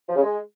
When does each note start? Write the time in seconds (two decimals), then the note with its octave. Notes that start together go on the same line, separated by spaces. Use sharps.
0.09 F3
0.16 C#3
0.23 G#3